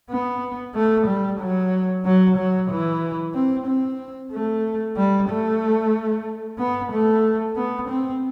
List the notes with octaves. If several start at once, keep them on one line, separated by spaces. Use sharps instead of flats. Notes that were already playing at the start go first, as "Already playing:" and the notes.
B3
A3
G3
F#3
F#3
F#3
E3
C4
C4
A3
G3
A3
B3
A3
B3
C4